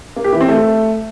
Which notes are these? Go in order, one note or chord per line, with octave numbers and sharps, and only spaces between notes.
A#3
G4
E3
C4
A3